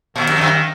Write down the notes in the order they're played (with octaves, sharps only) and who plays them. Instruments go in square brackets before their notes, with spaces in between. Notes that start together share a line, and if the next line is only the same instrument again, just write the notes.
[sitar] A#2 [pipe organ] D#3
[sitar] F#2
F2
F#2